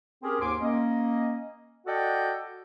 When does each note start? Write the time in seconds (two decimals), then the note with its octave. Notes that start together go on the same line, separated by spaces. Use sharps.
0.23 C4 C#4 G4 G#4 A#4
0.41 D#2 G#2 G#5 C6 D6
0.61 A#3 C#4 D#5
1.87 F#4 A4 D5 D#5 F#5 G5